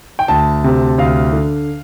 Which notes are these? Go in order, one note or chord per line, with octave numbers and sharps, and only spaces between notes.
G5
D2 A5
C3
D2 F5
D3